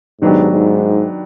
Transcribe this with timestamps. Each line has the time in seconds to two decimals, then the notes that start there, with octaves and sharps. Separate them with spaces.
0.21 G#2 D#3 F#3 B3 D4 G4
0.51 G#2